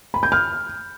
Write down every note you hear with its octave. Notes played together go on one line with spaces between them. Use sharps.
B5
G6
F6